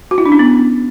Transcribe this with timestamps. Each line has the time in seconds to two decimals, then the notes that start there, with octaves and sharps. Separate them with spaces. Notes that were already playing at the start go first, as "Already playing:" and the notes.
0.11 F#4
0.18 E4
0.26 D4
0.32 C#4
0.39 B3